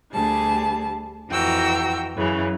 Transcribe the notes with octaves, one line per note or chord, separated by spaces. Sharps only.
D2 G3 G#4 A5
F2 E3 F#4 G5 A#5 E6
F#2 C#3 E3